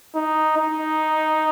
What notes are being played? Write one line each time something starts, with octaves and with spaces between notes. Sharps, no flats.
D#4
D#4